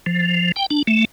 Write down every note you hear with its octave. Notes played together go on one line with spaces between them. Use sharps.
F3
G5
D4
A3